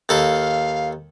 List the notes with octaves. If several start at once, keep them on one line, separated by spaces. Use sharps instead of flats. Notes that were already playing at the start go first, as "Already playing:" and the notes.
D#2 A4 F5 B5